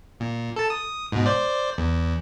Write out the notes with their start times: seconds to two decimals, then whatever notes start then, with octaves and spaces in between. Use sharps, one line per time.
0.20 A#2
0.56 A4 A5
0.70 D#6
1.12 G#2 B2
1.26 C5 D5
1.78 E2